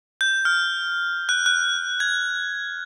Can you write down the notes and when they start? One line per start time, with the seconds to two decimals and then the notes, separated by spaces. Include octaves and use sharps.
0.21 G6
0.45 F6
1.29 F#6
1.46 F#6
2.00 G#6